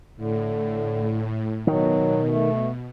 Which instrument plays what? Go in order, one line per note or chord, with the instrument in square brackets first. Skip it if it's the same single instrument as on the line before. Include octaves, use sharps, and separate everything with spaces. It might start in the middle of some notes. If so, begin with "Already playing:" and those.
[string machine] A2 [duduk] D3
[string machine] B2 [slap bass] D#3 [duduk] F#3
[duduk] A3